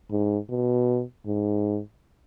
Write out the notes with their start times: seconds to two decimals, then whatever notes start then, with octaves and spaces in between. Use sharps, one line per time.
0.11 G#2
0.49 B2
1.26 G#2